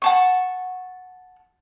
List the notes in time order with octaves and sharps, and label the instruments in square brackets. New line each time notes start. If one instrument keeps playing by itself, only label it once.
[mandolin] F#5 A5 C#6